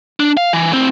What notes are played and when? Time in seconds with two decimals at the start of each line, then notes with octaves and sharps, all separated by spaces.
0.20 D4
0.37 F5
0.53 E3
0.71 A2 C4